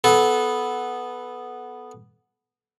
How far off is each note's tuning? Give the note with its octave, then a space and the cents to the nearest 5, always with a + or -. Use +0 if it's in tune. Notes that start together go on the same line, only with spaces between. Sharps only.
B3 +0 A4 -25